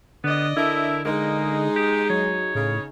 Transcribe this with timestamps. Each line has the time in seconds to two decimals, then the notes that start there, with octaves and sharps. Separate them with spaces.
0.24 D3 B3 D5 D#5
0.56 D3 D4 E4 A#4 E5
1.05 G#3 A#3 D#4 G#4
1.76 G4
2.10 F#3 C#5
2.55 A2 C#3